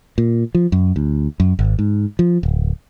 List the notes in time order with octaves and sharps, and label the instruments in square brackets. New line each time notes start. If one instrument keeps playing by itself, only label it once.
[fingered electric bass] A#2
F3
F#2
D2
F#2
G#1
G#2
F3
D1